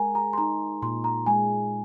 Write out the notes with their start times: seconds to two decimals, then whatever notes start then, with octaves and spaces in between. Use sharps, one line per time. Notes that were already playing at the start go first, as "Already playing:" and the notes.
Already playing: G#3 A#4 G#5 A#5
0.15 A#5
0.33 C6
0.38 D#4 A#5
0.82 A#2 C6
1.04 A#5
1.26 G#3 G#5